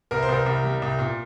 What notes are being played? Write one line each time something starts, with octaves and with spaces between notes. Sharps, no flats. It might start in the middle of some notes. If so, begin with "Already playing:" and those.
C2 A#4
C5
C2 A#4
C2
G3
C2
A#2